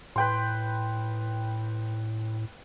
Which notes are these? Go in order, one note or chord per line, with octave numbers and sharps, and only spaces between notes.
A2 B4 G5 C6